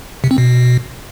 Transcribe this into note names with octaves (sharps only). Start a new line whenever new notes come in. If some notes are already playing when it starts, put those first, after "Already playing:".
C3
C4
B2